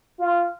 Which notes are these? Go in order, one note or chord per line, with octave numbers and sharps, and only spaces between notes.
F4